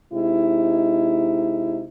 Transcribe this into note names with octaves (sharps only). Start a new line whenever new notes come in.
C3 G#3 D#4 E4